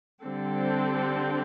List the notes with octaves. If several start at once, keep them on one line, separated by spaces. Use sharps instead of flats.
D3 G3 C4 A4